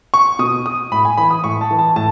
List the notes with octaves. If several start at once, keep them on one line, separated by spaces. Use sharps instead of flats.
C#6
B2 D#6
D#6
A2 B5
G#5
E3 B5
D#6
A2 C#6
A5
E3
A5
A2 A5